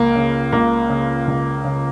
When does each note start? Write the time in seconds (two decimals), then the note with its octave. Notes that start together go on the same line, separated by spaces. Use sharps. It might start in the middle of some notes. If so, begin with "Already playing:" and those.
Already playing: C#2 A#3
0.16 C#3
0.53 C#2 A#3
0.90 C#3
1.28 C#2
1.64 C#3